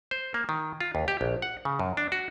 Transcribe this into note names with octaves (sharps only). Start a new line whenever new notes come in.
C5
A#3
D#3
F4
D#2
G4
A#1
F#5
C#3
F#2
D4
F#4